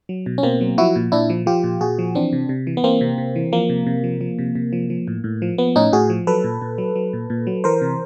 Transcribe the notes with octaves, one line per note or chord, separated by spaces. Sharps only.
F#3
B2
C#4
B2 A#3 C4
F#3
F3 E4 F#4
A#2
A#2 D4 E4
F3
F3 F4 G4
A#2
A#2 F#4 G#4
F3
E3 C4 D4
C3
C3
E3
B3
E3 A#3 C4
C3
C3
E3
F3 A#3
C3
C3
F3
F3
C3
C3
F3
F3
A2
A2
F3
F3 B3
A2 C#4 D#4
A2 F#4 G#4
F3
F#3 A4 B4
A#2
A#2
F#3
F#3
A#2
A#2
F#3
E3 A#4 C5
C3